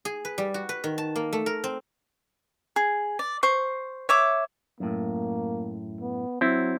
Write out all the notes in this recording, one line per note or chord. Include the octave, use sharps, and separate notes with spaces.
G#4
B4
G3
F#4
B4
D#3
A5
A#3
A3
A#4
C4
G#4
D5
C5 C#6
C#5 E5 D6
F#2 A2 A#3
B3
F#3 C4 E4